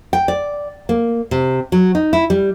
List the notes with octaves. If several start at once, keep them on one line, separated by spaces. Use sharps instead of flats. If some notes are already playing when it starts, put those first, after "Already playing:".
G5
D5
A#3
C3
F#3
D#4
E4
G3